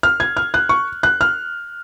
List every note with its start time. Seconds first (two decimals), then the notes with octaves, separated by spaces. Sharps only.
0.03 F6
0.20 G#6
0.37 F6
0.54 F#6
0.69 C#6
1.03 F#6
1.21 F6